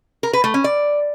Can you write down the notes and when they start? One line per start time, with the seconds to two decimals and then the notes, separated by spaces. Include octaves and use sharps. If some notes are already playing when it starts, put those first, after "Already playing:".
0.23 A#4
0.33 B4
0.44 A3
0.54 C#4
0.64 D5